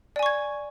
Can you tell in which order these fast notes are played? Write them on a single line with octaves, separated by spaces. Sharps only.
D5 G#5 C#6 G#6